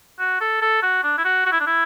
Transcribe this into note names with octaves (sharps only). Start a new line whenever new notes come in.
F#4
A4
A4
F#4
D4
E4
F#4
F#4
E4
D4
E4